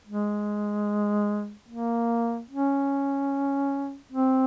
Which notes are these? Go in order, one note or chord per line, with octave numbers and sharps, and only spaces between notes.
G#3
A#3
C#4
C4